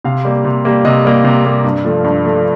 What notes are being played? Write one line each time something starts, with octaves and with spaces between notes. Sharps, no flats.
C3 F5
G3 A#3
C3
G3 A#3
C3 D#5
G3 A#3
C3
G3 A#3
G2
F3 A3
G2
F3 A3